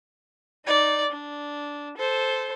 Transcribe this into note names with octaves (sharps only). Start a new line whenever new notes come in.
D#4 D5
D4
A4 C5